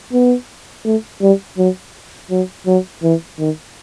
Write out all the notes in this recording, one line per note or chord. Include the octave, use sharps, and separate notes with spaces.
B3
A3
G3
F#3
F#3
F#3
E3
D#3